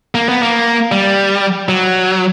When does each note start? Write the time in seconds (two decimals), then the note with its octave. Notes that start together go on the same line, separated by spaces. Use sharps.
0.15 A#3
0.29 B3
0.43 A#3
0.92 G3
1.69 F#3